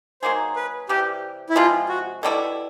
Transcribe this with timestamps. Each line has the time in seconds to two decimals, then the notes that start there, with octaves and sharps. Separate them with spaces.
0.22 F#3 A#3 D#4 G#4 C5
0.56 B4
0.89 C3 E3 G3 G4
1.50 E4
1.56 C3 F3 G#3 F4
1.89 F#4
2.23 B2 G3 C4 E4 A4